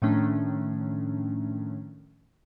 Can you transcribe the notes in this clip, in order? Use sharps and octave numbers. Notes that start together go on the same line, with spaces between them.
A2 D#3 F3 A3 C#4 D4